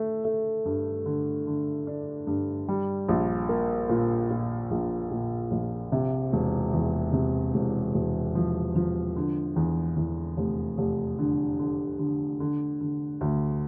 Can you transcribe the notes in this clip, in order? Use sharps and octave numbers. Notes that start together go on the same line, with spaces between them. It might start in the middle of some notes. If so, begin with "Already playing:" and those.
Already playing: A3
A3
G2
D3
D3
D4
G2
G3
A#1
A#3
A#2
A#2
A#1
A#2
A#1
C3
E1
E2
C3
E1
E1
F3
F3
D3
E2
E2
F1
F1
D3
D3
D3
D3
D3
D2